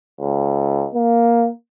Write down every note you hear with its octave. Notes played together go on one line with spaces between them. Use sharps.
C#2
A#3